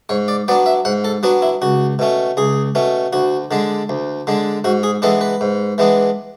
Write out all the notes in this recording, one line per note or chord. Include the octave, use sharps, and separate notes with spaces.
G#2 C#5
D5
F#3 B3 D4 D5
E5
G#2 F#5
A4
F#3 B3 D4 F#4
E4
C#2 F#4
B2 A3 C#4
C#2 G#4
B2 A3 C#4
D2 F#4
D3 G#3 D4
D2
D3 G#3 D4
G#2 F#4
G#4
E3 G#3 B3 D4 A4
B4
G#2
E3 G#3 B3 D4